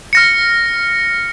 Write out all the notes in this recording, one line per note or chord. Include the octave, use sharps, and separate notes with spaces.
F6 A#6 C#7